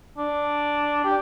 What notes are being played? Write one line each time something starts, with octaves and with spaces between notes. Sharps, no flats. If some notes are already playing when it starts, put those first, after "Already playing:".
D4
G4